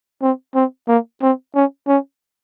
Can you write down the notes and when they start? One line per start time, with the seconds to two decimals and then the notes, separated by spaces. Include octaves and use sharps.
0.22 C4
0.55 C4
0.88 A#3
1.22 C4
1.55 C#4
1.88 C#4